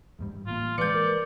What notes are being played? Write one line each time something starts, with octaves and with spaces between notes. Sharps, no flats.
E2 G#2 G3
A1 A#3 F4
E3 G#3 B4 D5 G6 C#7
A#4